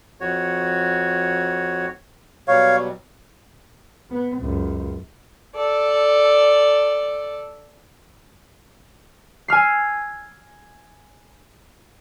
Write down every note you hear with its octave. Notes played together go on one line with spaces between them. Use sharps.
F2 F#4 C#5
B2 F#3 G3 C#5 F5
B3
C#2 F#2
A4 D5
G#5 E6 F6 C7